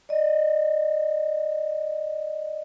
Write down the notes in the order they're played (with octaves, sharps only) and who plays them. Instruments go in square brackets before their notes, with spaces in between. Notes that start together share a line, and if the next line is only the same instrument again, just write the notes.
[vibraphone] D5 D#5